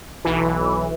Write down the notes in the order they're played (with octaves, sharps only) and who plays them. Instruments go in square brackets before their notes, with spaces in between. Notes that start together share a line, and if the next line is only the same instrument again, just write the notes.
[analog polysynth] B1 E3